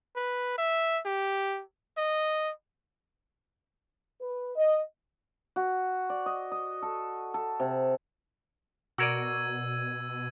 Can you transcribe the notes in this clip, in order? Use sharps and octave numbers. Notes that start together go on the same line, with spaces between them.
B4
E5
G4
D#5
B4
D#5
F#4
D5
D#5
D#5
A4
A4
C3
B2 F#4 A#4 D5 E6 G#6 D#7